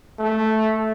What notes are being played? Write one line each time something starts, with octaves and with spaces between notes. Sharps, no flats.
A3